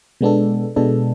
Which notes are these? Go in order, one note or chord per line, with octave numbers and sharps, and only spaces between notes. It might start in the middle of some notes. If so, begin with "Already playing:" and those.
B2 G#3 B3 D4 A4
B2 G#3 B3 D4 A4